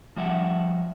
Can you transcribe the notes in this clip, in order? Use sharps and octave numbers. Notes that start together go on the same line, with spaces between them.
F3 G3 E5 F#5